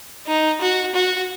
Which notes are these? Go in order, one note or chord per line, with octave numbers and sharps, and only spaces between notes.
D#4
F#4
F#4